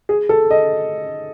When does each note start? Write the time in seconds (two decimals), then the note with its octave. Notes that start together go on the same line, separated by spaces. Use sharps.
0.09 G#4
0.29 A4
0.51 D#5